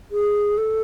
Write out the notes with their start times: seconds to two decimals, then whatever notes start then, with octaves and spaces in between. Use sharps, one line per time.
0.12 G#4
0.58 A4